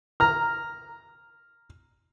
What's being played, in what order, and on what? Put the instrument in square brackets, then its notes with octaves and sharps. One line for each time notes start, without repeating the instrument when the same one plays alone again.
[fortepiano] A#5 F6